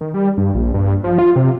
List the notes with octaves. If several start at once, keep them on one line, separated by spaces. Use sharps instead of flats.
D#3
G3
G2
A#1
G2
F3
F4
C3